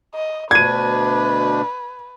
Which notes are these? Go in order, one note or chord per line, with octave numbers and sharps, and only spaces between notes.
D#5
D2 B2 D4 B4 G#6 D#7